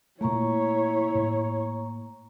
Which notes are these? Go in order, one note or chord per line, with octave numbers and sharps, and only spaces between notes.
A#2 A3 A#3 E4 C#5 A#5 C#6
A2